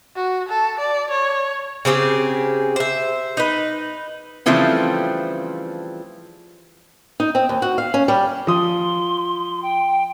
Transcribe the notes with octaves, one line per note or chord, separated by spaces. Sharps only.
F#4
A4
D5
C#5
C#3 C4 G4 G#4
C5 E5
D#4 B4
C#3 E3 F3 G3 A3 C4
D#4
C4
D#2
F#4
F5
C#4
G3
F3 C6 D#6
G5